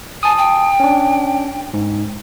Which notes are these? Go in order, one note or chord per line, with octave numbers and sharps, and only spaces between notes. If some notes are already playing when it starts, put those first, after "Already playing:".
G#5 A5 D#6
G5
C#4 D4
G#2